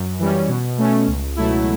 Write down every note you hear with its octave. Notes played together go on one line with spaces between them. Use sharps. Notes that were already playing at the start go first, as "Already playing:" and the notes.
Already playing: F#2
E3 G3 C#4
B2
A3 C#4
C#2
B2 F#3 A3 E4